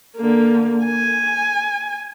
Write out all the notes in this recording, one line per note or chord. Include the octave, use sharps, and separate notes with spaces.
D3 A#3
G#5